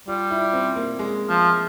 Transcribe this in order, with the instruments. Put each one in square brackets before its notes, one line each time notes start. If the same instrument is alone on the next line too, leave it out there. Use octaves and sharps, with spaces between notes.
[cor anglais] G3 [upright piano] F4
[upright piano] E4
C4
A#3
G#3
[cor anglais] F3